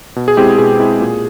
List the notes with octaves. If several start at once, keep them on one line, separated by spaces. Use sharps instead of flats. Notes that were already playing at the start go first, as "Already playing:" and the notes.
B2
G#4
G#3 C4 E4 G4
B2 G#4
G#3 C4 E4
A#2